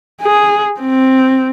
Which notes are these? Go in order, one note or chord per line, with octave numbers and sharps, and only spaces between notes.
G#4
C4